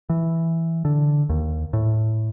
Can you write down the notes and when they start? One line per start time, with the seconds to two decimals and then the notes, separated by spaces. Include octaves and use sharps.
0.10 E3
0.85 D3
1.29 D#2
1.73 A2